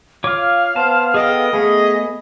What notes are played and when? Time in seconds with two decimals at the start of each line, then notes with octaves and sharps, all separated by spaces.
0.24 F4 C#5 F5 D6
0.76 B3 C5 A5
1.14 G#4 A4 D#5 G5
1.53 A3 B3 G#4